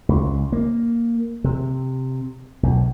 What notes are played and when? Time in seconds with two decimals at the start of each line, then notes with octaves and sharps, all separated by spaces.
0.09 C#2
0.52 A#3
1.44 C3
2.63 B1